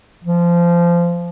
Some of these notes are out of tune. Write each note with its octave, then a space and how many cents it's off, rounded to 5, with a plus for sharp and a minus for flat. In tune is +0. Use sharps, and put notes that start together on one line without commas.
F3 -20